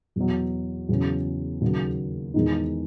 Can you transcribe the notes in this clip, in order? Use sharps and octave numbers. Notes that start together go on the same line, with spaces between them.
E2 B2 F#3
E2 C#3 F#3 C#4 G#4
D#2 C#3 F#3 A#3
E2 D#3 G#3 D#4